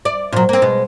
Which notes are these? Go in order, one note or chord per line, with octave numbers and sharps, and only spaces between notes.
D5
A#2 F#3 C5
A#3 C4
B2 G#3